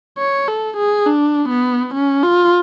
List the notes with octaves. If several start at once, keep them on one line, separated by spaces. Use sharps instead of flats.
C#5
A4
G#4
D4
B3
C#4
F4